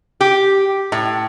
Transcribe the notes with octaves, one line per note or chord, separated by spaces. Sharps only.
G4
A2